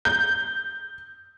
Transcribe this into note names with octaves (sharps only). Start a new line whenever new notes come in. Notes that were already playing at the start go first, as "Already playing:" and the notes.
G6